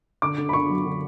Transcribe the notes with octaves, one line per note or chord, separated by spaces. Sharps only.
D3 D6
D3
B5
D4 C#6
F#3
D3